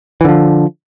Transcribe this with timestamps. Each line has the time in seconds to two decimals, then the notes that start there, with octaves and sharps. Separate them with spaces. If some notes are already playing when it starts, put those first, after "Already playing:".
0.21 E3
0.25 D3
0.29 F3